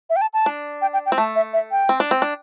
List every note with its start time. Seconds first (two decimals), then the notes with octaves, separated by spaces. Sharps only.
0.10 E5
0.16 G5
0.22 A5
0.34 A5
0.46 D4
0.82 G5
0.93 G5
1.06 G5
1.12 C4
1.17 A3 A5
1.36 E5
1.53 E5
1.71 G5
1.89 C4
2.00 D4
2.11 C4
2.22 D4